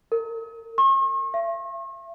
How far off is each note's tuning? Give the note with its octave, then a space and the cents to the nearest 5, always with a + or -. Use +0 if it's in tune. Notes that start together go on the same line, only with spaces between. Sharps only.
A#4 -30
C#6 -45
E5 +40